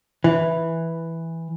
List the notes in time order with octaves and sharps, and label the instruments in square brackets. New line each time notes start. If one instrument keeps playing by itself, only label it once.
[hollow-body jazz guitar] E3